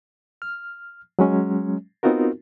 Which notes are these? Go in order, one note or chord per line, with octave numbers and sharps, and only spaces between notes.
F6
F#3 G#3 C#4
B3 C4 D#4 F4 F#4 A#4